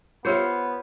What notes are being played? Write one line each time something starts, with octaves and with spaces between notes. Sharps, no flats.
B3 F4 G4 C5 C#5 E5 F5